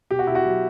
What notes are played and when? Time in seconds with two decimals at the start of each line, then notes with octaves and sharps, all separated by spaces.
0.11 B2 G4
0.19 F#4
0.27 B2 E4
0.35 F#4
0.45 F#3